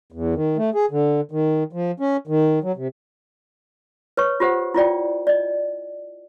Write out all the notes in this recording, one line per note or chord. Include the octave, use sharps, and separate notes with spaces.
E2
D#3
A3
G#4
D3
D#3
F3
C#4
D#3
F#3
C3
B4 C#5 C#6
F4 G4 C5 F#5
E4 F4 D5 G5
D5 D#5